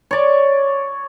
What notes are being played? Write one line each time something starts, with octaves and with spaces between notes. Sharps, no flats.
C#5 D5